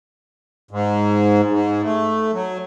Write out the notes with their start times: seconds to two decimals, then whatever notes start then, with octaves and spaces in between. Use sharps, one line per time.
0.71 G#2
1.50 G#2
1.83 A3
2.33 F#3